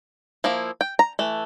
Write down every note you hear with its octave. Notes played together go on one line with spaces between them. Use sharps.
F3 A#3 E4
G5
A#5
E3 A3